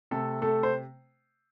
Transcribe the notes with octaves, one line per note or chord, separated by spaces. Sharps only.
C3 A3 A4
A3 A4
C5